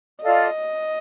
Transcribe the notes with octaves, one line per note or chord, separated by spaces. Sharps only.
F4 A4 D5 D#5 F5